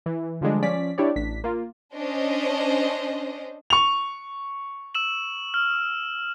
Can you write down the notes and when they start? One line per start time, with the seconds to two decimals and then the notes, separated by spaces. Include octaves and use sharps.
0.06 E3
0.41 D3 F3 G3 G#3 D4
0.62 F3 C#4 D5 B6
0.98 D4 E4 G4 C#5 D5
1.16 A1 D4 B6
1.44 A#3 F4
1.94 C#4 D4 C5 D#5
3.70 C#6 F7
4.95 E6 E7 F#7
5.54 F6